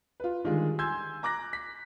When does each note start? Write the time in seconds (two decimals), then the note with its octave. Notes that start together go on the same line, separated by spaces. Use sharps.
0.20 F4 B4
0.44 D3 D#3 G3 G#3 F4 G#4
0.79 G#5 C6 E6 G6 G#6
1.23 A#5 D6 F#6 A#6
1.53 B6